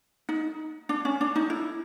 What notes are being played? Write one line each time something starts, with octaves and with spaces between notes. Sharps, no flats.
D#4
D4
C#4
D4
D#4
E4